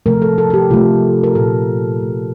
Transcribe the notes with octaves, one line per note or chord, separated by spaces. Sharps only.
C3 F3 A3 A#4
A4
A4
A4
G4
C3 F3 A3 F4
A#4
A#2 A3 A4
A#2 A3